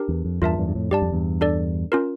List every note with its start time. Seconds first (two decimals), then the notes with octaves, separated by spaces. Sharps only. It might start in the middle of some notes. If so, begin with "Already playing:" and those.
Already playing: D4 G4 A#4
0.09 E2
0.25 F2
0.42 E2 G2 F4 A#4 E5 A5
0.57 E2 G2
0.68 G2
0.75 F2 A2
0.91 G2 G4 D5 A5
1.02 F2
1.12 E2 G2
1.41 D4 A4 D5
1.92 C#4 F4 A#4